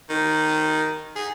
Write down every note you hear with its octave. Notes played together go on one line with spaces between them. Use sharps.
D#3
G#4